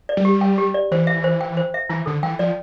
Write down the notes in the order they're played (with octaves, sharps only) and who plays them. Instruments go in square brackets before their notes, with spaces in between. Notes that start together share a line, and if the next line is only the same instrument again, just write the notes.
[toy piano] D5
[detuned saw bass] G3
[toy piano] G4
G5
G4
D5
[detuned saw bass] E3 [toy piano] C5
[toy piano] E5
C5
G5
C5
E5
[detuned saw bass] E3 [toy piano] E4
[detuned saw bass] D3 [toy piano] A4
[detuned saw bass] E3 [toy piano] G5
[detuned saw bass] F3 [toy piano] D5